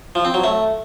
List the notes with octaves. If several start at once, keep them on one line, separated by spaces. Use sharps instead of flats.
F3
C4
F#3
A3